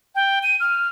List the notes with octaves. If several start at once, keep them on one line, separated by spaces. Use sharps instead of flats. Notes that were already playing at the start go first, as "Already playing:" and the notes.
G5
D#7
F6